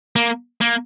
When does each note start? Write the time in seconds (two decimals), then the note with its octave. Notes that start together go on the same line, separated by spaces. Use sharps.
0.16 A#3
0.61 A#3